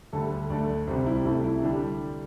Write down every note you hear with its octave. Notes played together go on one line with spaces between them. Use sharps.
D2 D3 G3 A4
D2 D3 A3 D5
C2 C3 G3 C5
E4
C2 C3 A3
E4
D3 G3 D4